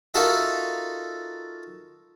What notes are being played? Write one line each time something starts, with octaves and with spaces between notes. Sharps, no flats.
D#4 F4 F#4 A4 A#4 E5